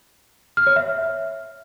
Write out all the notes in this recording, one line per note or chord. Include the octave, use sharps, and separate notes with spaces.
F6
C#5
E5